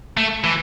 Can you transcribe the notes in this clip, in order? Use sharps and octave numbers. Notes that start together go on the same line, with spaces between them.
A3
E3